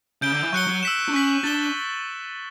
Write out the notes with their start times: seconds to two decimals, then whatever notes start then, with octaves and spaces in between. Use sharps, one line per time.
0.22 C#3 G6 D7 G7
0.32 D3
0.42 E3
0.53 F#3 C#6 F#6 C#7 G7
0.68 F#3
0.83 E6 B6 E7
1.08 D4
1.13 C#4 C#6 F#6 B6 F#7
1.44 D4 A6 E7 G7